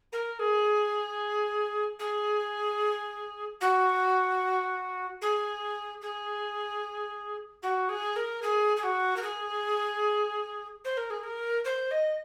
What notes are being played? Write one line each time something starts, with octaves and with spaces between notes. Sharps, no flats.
A#4
G#4
G#4
F#4
G#4
G#4
F#4
G#4
A#4
G#4
G#4
F#4
A#4
G#4
C5
A#4
G#4
A#4
C5
D#5